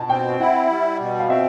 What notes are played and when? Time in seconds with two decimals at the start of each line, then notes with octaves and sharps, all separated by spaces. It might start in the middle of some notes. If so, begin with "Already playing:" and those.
Already playing: B2 A5
0.09 C4 G5
0.40 E4 F#5
0.69 G3
1.00 B2
1.20 F5
1.29 C4 E5